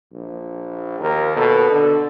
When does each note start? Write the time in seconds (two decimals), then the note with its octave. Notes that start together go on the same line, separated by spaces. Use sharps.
0.13 A#1
1.01 D#2 A#4
1.36 B2 A4
1.71 D3